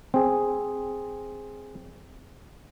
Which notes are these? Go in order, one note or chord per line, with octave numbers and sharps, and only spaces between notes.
C4 G#4